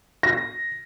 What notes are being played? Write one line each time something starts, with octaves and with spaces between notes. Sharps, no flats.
A#6